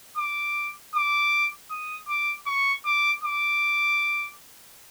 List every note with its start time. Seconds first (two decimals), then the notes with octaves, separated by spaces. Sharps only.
0.18 D6
0.95 D6
1.71 D#6
2.09 D6
2.47 C#6
2.86 D6
3.24 D6